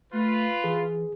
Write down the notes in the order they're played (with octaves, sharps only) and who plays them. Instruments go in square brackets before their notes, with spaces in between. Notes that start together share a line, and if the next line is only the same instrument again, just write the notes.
[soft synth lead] A3 [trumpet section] F4 B4
[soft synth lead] E3 [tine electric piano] G#4